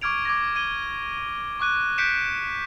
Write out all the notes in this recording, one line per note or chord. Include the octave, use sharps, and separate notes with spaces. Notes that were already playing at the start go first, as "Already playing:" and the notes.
C#6 D6 F6 G#6 D7 F7
D6 G#6 A#6
G#6 D#7 G7
C#6 D6 F#6 D#7
F#6 G6 B6 C#7 D7 E7